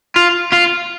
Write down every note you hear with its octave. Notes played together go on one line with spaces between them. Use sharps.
F4
F4